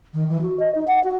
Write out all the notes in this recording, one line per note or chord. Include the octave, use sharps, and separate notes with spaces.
D#3
E3
F#4
D#5
D#4
F#5
F#4